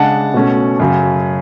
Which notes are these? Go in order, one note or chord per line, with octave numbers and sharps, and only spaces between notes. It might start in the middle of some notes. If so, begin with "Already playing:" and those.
Already playing: C#3 G#3 D4 F#5 A5
B2 A3 C#4
F#2 C#3 F#3